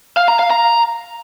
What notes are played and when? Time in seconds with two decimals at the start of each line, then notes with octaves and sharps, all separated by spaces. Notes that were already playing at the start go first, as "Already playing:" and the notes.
0.17 F5
0.28 A#5
0.39 F5
0.50 A#5